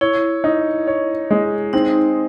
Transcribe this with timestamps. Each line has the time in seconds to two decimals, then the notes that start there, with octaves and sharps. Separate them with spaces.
0.01 E4 C#5
0.44 D#4
0.87 C#5
1.31 G#3
1.73 C4 D#4